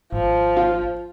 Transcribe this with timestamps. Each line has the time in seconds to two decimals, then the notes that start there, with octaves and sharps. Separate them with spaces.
0.12 G#1 F3
0.57 F4